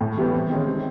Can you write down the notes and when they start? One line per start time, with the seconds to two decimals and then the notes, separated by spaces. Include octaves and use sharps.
0.01 A2
0.17 E3 G3 B3
0.34 C3
0.50 D#3 G#3 C#4
0.66 C3